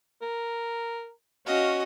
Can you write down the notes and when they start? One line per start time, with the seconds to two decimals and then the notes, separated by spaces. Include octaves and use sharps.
0.21 A#4
1.47 C#4 F#4 D#5 F5